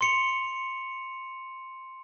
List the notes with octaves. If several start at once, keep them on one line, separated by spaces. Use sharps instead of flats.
C6 C#7 F7